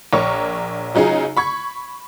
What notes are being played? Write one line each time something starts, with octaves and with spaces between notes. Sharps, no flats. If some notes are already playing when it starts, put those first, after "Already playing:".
A#1 A#4 C#5 C#6
C#3 F#3 D#4 F4 G#4
B5 C#6 G#6